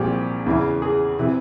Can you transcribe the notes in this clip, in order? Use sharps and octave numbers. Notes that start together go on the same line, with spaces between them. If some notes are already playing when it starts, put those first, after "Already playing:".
Already playing: C2 A#2 F3 G4 G#4
E2 C#3 E3
G#4
C3 E3